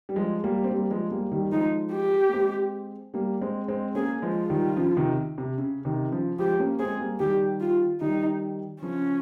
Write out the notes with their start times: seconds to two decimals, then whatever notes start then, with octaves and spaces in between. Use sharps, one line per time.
0.09 G3
0.16 F3 G#3
0.44 G3 A#3
0.64 C4
0.71 G3 A#3
0.91 F3 G#3
1.11 G3 A#3
1.32 D#3 G3
1.52 F3 G#3 D#4
1.93 G4
2.29 A#3
2.33 G#3 C4
3.14 G3 A#3
3.42 G#3 C4
3.68 G#3 C4
3.95 A#3 C#4 G#4
4.22 F3 G#3
4.36 F4
4.50 D#3 G3
4.77 C#3 F3
4.97 C3 D#3
5.38 C3
5.58 C#3
5.85 C3 D#3
6.12 C#3 F3
6.39 F3 G#3 G4
6.59 A#3 C#4
6.80 G#3 C4 G#4
7.00 G3 A#3
7.20 D#3 G3 G4
7.61 F4
8.01 D#3 G3 D#4
8.82 C#3 F3 C#4